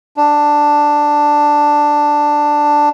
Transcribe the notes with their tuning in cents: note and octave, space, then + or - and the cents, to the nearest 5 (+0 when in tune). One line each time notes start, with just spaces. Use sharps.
D4 +5